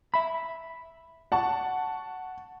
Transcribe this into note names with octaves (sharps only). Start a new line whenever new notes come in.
E5 B5
F#5 A5 C#6